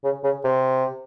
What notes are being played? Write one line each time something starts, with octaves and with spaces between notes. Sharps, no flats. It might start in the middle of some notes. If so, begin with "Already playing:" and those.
C#3
C#3
C3